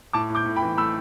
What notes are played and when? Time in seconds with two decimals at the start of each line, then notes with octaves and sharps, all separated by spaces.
0.13 A2 A5 D6
0.30 A2
0.35 D6 G6
0.46 A2
0.56 G5 B5
0.62 E3
0.77 A3 B5 E6